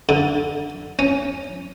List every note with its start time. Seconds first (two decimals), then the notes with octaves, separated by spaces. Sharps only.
0.09 D3
0.99 C#4